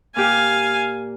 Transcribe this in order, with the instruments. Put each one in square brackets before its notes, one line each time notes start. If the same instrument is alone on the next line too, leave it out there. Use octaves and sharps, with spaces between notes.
[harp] A#2 G4 [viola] F5 G#5